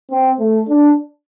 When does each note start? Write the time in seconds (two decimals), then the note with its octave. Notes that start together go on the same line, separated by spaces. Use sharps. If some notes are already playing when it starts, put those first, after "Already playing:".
0.11 C4
0.40 A3
0.69 D4